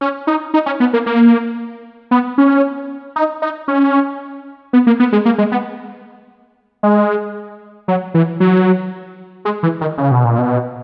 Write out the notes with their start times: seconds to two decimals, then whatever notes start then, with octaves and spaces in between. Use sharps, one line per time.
0.01 C#4
0.27 D#4
0.54 D#4
0.66 C#4
0.80 B3
0.93 A#3
1.06 A#3
2.11 B3
2.38 C#4
3.16 D#4
3.42 D#4
3.68 C#4
4.73 B3
4.87 A#3
5.00 B3
5.12 G#3
5.25 A#3
5.38 G#3
5.52 B3
6.83 G#3
7.88 F#3
8.14 E3
8.40 F#3
9.45 G#3
9.63 E3
9.81 D#3
9.98 C#3
10.11 B2
10.24 A#2
10.38 B2